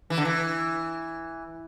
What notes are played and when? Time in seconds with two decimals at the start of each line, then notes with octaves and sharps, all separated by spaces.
0.10 E3
0.18 D3
0.25 E3